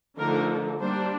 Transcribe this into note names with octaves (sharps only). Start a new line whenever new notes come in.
D3 F3 A3 D#4 A#4
G3 A#3 D4 C5